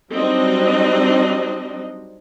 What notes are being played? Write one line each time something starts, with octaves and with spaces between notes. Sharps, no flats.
F#3 G3 C4 D4 D#4 D#5